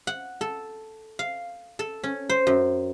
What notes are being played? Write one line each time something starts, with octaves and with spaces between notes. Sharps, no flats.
F#5
A4
F5
A4
C#4
C5
F#2